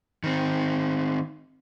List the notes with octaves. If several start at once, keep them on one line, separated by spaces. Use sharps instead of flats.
D#3 C4